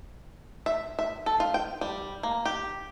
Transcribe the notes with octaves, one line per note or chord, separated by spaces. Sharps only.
E5
E5
A4
F4
G5
G3
A#3
G4